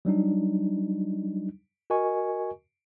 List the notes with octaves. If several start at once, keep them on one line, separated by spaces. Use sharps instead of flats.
F#3 G3 D4 D#4
F#4 A#4 D#5 G#5 C#6